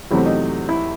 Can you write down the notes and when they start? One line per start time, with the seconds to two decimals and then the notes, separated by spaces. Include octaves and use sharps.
0.11 E2 C3 F#3 A3 C4 E4
0.26 D#4
0.69 E4